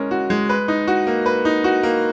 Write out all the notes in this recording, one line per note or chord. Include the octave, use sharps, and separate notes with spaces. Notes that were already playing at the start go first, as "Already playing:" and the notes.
Already playing: G#3 C#4 A#4
F#4
G#3
B4
D#4
F#4
A#3
B4
D#4
F#4
A#3